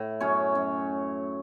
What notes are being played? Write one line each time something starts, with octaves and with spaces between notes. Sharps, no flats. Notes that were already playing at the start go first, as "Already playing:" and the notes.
Already playing: A2
F#2 C#4 C#5
F#2